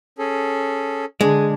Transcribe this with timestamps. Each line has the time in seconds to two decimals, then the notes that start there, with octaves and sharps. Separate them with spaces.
0.18 C#4 G#4 A4
1.21 D3 G#3 D4 G#4